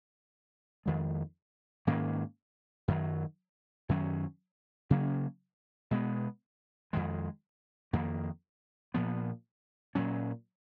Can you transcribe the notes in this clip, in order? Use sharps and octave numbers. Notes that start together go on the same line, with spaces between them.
F2 D#3 G#3
G#2 D#3 A#3 C#4
F#2 D#3 F#3
F#2 D#3 F#3 C#4
C#3 F#3 A#3 C#4
B2 G#3 B3
F2 D#3 G#3
F2 D#3 A#3
A#2 F3 B3
A#2 F#3 C#4